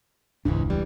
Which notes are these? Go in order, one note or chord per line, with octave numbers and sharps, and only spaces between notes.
E1 C#2 G#2 C#3 E3 D4
E3 G3